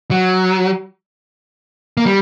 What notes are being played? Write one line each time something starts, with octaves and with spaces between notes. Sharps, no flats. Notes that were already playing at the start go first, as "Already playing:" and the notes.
F#3
A#3
G3